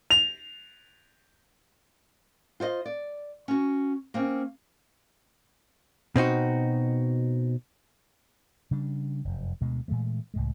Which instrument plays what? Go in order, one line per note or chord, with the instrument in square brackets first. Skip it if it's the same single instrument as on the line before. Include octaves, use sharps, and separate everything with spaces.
[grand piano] F7
[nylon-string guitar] F4 C5 C#5 D#5
D5
C#4 F#4
A#3 C4 C#4
[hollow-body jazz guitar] B2 C4 D#4 F#4
[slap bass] C#3 G3 D4
F1 F#2
D2 B2 G#3
A#2 E3 G#3 A3
C#2 A2 G#3